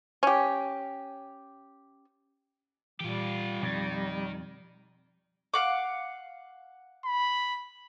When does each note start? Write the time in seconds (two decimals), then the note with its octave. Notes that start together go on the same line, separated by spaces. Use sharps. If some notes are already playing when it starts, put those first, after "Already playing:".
0.23 C#4 G4
3.00 A#2 E3 G3 F4 G4
3.62 F2 B2 D#3
5.54 F5 F#5 D6
7.05 B5